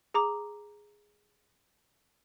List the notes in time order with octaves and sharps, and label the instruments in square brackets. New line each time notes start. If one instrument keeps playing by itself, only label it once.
[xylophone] G#4 A#5 D6